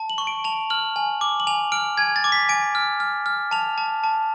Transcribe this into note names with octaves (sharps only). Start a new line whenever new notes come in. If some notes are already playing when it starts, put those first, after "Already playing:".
Already playing: A5
F#7
C#6
D7
A5 F7
F6 F#7
G#5
D6
F#7
G#5 F7
F6 D7
G#5 G#6
A6
D6
B6
G#5 D7
F6
F6
F6
A5 F7
A5
A5